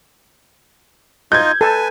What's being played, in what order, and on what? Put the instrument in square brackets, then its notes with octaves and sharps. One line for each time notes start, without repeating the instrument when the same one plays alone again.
[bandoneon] D#4 F4 D#5 [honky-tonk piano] G6 G#6
[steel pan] A4 A5 [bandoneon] B4 G#5